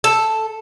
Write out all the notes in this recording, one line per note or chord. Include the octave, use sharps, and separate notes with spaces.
A4